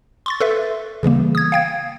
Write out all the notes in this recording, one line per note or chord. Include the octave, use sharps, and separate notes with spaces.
C6 C#6 A6
A4 B4 E5
C#3 E3 G3 A#3
D#6 G#6
F5 G5 G#6